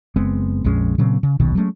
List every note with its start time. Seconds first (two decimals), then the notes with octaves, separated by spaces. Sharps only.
0.16 F#1 G#3 B3 C4
0.64 A#1 F2 G#3 C#4
0.98 A#2 C#3 F#3 C4
1.23 C#3
1.40 D#1 B1 B2 D#3
1.55 F#3 G#3 A3 C#4